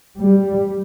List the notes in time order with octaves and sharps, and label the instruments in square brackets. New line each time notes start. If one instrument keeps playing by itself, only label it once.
[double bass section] G3